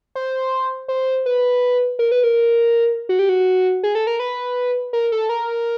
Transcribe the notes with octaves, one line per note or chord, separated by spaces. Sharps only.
C5
C5
B4
A#4
B4
A#4
F#4
G4
F#4
G#4
A4
A#4
B4
A#4
A4
A#4